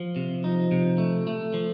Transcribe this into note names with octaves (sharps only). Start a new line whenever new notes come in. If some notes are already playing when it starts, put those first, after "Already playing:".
Already playing: F3
C3
F3 D#4
C3
A3
A3
F3